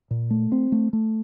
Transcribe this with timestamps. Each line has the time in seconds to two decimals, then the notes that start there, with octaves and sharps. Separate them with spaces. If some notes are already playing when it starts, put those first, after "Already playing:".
0.11 A#2
0.31 A3
0.52 C4
0.72 A3
0.93 A3